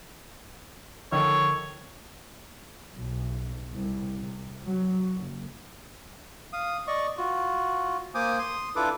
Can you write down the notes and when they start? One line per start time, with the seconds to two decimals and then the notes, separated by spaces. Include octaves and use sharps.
1.12 D3 D#3 F3 A4 C#5
2.94 B1
3.72 C2
4.18 C3
4.66 F#3
5.18 F#1
6.53 F5 D#6
6.87 D5 D#5 C#6
7.17 F4 F#4
8.15 A#3 C5 G#5 D6 D#6
8.39 C6 D#6
8.76 D4 E4 F4 A4 B4 D6